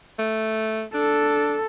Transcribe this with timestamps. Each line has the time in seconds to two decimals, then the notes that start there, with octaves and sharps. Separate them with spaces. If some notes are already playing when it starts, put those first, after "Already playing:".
0.19 A3
0.94 D4 A4